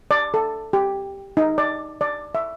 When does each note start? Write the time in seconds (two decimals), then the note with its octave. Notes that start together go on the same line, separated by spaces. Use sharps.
0.11 D5
0.34 A4
0.73 G4
1.37 D#4
1.58 D5
2.01 D5
2.35 E5